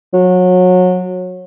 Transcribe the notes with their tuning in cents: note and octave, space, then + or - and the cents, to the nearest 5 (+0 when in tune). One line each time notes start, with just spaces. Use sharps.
F#3 -25